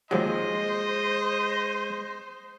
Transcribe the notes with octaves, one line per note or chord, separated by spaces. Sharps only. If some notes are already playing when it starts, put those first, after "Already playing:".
D#2 F3 F#3 G#3 C5 D#5